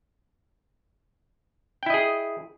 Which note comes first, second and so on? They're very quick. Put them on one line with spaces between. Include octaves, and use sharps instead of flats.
G5 E4 D#5 G#4